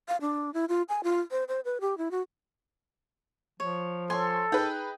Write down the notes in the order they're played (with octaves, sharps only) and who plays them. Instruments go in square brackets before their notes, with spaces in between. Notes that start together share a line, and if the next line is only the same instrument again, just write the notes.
[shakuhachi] F5
D4
E4
F4
G#5
F4
C5
C5
B4
G4
E4
F#4
[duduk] F3 [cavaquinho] C#5
[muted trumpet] A4 [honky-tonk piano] C#5 C6 [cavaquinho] G#5
[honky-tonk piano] D#4 G#4 B4 [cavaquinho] G5